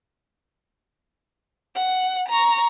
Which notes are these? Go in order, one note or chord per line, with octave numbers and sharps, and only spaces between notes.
F#5
A#5 C#6